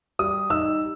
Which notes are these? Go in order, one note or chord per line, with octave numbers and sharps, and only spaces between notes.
G3 D#6
D#4 E6